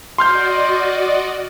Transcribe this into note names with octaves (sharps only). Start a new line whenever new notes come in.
F#4 D5 D#5 C6 F6 G6